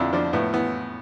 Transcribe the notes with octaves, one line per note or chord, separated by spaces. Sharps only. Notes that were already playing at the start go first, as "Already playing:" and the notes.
Already playing: F2 D3 D4 E4
F3 D4
A2 B3
E3 B3